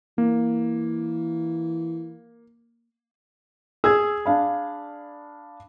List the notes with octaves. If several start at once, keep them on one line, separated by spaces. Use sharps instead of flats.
E3 A#3
G#4 E6 G#6
D4 F5 B5